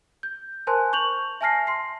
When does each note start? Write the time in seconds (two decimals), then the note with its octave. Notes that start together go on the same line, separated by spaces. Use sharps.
0.23 G6
0.67 A#4 C5 G#5 A5 C6 F#6
0.93 C#6 G6 F7 F#7
1.41 E5 G#5 A5 F6 A#6 C7
1.67 C6 C7